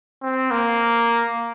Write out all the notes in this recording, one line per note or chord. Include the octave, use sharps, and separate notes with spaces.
C4
A#3